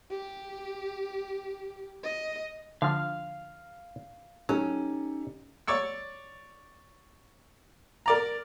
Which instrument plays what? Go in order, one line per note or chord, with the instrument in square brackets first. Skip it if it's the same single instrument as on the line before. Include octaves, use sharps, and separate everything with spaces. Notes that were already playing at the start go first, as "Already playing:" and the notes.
[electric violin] G4
D#5
[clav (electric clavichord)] D3 F3 [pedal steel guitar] F5 F6
[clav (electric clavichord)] F#3 [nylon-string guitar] C#4 [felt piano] D#4 G4 A4
[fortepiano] C#5 D5 C#6 E6
A#4 D5 A#5